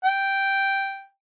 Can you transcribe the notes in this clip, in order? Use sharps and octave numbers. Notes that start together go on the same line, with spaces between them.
G5